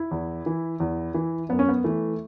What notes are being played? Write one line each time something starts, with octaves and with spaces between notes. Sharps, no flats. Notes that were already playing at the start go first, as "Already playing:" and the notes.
Already playing: E4
E2
E3
E2
E3
F#2 B3
C#4
B3
E3 A3